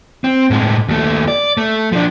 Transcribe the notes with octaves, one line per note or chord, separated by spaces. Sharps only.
C4
A2 G#3
D#2 A3
D5
A3
F3 D4